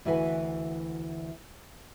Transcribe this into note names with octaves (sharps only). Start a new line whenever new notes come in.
D2 E3 E4 F#4 B4 G#5